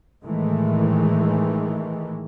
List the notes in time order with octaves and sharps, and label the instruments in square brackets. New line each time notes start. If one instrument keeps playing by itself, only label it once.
[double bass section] A2 D#3 E3 G#3 A3